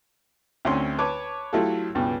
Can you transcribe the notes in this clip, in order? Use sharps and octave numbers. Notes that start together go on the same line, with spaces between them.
D2 C4 C#4 C6
B4 C#5 A5 D6
F#3 A3 E4 F4 G4 A4
C#2 G2 B2